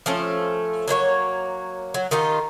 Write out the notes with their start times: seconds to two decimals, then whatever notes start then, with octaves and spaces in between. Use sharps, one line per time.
0.06 F3 A3 C#4
0.88 F#3 A#3 D#4 C#5
1.94 F#3
2.11 D#3 D#4 F4 G4